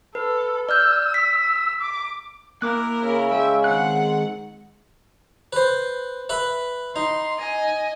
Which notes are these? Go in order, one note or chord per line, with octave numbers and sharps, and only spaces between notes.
A4 B4
D5 E6 F6 G6
B6
D6
A#3 E4 A#4 D6 F#6
C#3 E4
G#3 E5 G5
D#3 C4 F#5 F#6
B4 C5
B4 E5 B5
D#4 C6
D#5 G#5